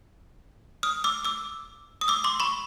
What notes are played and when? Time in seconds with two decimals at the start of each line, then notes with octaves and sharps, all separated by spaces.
0.83 D#6 F6
1.04 D6 E6
1.25 D6 E6
2.01 D#6
2.08 D6 E6
2.24 C6 D6
2.40 B5 C#6